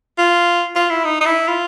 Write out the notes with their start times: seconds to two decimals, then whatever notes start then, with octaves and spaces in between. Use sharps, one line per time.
0.18 F4
0.75 F4
0.90 E4
1.04 D#4
1.21 D#4
1.26 E4
1.48 F4